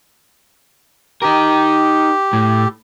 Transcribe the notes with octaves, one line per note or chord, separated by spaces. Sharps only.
D#4 G4 A#4
A2